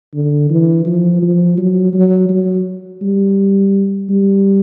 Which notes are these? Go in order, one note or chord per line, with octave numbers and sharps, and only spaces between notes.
D3
E3
F3
F3
F#3
F#3
F#3
G3
G3